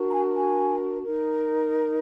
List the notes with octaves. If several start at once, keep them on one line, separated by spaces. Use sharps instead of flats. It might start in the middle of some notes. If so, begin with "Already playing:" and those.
Already playing: D4 F#4 A#4
A#5
G#5
G#5
D#4 A#4